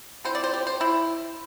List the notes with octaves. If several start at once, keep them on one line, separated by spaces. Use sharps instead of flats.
D3 C4 E4 C5
D5
C5
G4
C5
E4